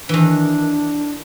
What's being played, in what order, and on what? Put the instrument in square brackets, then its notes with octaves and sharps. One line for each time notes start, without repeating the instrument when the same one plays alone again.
[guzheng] D#3 E3 [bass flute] D4